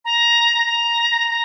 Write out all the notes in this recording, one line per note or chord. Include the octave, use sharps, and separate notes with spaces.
A#5
A#5
A#5